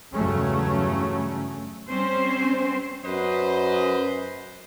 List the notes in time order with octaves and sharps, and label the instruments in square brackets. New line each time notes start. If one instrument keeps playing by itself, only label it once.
[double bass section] E2 G2 C#3 F#3 A3 C#4
[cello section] G3 C4 C#4 C5
[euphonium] F#2 [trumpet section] B4 C5 D#5